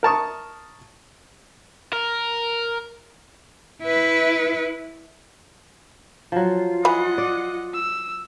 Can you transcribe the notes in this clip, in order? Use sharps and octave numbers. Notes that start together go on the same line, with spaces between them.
A#4 A5 C#6 D#6
A#4
E4 B4
F3 F#3 F4
E3 D#5 F#5 B5
D5
E6